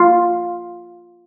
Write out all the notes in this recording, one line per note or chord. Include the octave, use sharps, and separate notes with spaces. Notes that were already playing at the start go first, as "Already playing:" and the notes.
Already playing: F4